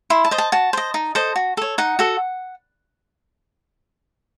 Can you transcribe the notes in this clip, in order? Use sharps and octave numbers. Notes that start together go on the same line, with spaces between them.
E4 C6
A5
C5 D#5
A5
F#4 A5
C5 D#5
D#4
A4 C5 D#5
F#4
A4 C#5
D#4 F#5
F#4 A4